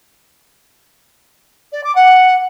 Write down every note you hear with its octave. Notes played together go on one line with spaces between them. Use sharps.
D5
D6
F#5